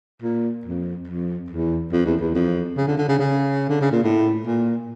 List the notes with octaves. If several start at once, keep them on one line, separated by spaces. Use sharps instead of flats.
A#2
F2
F2
E2
F2
E2
E2
F2
C#3
D3
D3
C#3
C#3
D3
C#3
A#2
A2
A#2